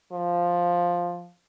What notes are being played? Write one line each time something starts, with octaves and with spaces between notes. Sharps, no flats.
F3